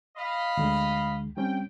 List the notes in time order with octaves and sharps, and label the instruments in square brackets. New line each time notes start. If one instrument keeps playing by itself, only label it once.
[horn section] D#5 F5 B5
[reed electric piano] D2 D3 G#3
[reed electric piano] G3 C4 C#4 [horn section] G5